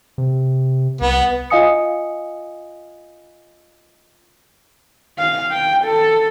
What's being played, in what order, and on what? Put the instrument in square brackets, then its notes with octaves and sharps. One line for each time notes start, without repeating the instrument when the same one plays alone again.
[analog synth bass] C3
[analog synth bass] C2 [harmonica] B3
[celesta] F4 D#5 F5 G#5 D#6 C#7
[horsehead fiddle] F5
G5
A4